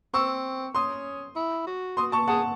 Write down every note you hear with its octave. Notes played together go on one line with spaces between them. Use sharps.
C4 C#6 E6
C#4 C6 D#6
E4
F#4
C6 D#6
A5 C#6
G#4 F#5 A5